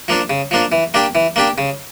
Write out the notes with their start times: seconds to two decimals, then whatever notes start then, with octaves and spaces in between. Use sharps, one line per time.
0.08 F3 A#3 D4
0.30 C#3
0.51 F3 A#3 D4
0.72 E3
0.94 A#3 D4 G4
1.15 E3
1.36 A#3 D4 G4
1.58 C#3